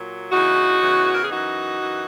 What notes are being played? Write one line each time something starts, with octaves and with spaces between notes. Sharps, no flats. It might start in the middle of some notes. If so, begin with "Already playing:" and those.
Already playing: A#2 F#3
E2 C#3 E3 D#4 F#4
E2 C#3 E3
A#4
G#4
F#2 E3 D#4 F#4
F#2 E3